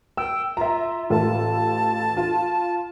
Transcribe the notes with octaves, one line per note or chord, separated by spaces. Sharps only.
G5 E6
F4 E5 A#5
A1 F4 A4 A5
F4